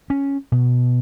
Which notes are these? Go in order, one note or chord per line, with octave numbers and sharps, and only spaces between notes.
C#4
B2